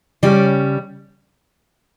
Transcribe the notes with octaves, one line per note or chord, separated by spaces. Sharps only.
C#3 G3 C#4 D5